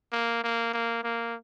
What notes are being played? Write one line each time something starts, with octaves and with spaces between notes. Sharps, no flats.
A#3
A#3
A#3
A#3